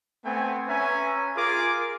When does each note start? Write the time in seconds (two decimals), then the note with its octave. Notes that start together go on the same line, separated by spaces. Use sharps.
0.25 A3 B3 C4 G#5
0.68 C#4 B4 E5 G#5 A#5
1.36 F4 G#4 A#4 G#5 D6